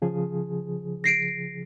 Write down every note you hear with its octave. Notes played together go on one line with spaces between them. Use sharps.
C#3 F3 G#4
A#6 C7 D7